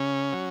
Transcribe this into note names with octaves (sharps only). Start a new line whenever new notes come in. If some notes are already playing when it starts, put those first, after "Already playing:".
Already playing: C#3 C#4
F#3